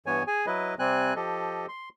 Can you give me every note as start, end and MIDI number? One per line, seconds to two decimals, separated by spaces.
0.06 0.23 43
0.06 0.23 52
0.06 0.23 59
0.06 0.23 73
0.06 0.23 80
0.27 0.46 68
0.27 0.46 80
0.47 0.75 54
0.47 0.75 64
0.47 0.75 71
0.47 0.75 75
0.79 1.14 48
0.79 1.14 55
0.79 1.14 60
0.79 1.14 80
0.79 1.14 90
1.16 1.66 53
1.16 1.66 67
1.16 1.66 69
1.16 1.66 75
1.68 1.89 84